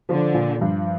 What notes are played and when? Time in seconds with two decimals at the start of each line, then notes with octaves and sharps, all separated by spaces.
0.09 D3 F3
0.34 A#2
0.61 G2 F3